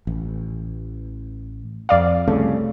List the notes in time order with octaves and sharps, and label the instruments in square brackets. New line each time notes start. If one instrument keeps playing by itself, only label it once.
[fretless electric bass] A1
[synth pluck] F2 D5 F5
[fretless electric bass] C2 C#3 [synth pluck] A3